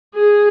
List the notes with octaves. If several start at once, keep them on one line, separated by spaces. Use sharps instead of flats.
G#4